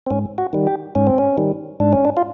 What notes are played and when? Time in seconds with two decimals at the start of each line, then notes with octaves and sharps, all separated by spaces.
0.06 C4
0.10 G#2 C#4
0.38 F#4
0.53 D#3 G3
0.67 G4
0.95 G#2 C#4
1.07 C4
1.18 C#4
1.38 D#3 G3
1.80 G#2 D4
1.93 C#4
2.05 D4
2.17 F4